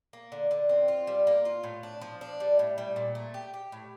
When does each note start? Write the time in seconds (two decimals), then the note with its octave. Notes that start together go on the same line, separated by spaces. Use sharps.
0.13 A#3
0.32 D3
0.51 D3
0.69 C4
0.88 F4
1.07 G3
1.27 A#3
1.45 F4
1.63 A2
1.83 D4
2.01 F3
2.21 D4
2.40 G3
2.59 A2
2.78 G3
2.96 A#2
3.15 A3
3.34 G4
3.54 G4
3.72 A2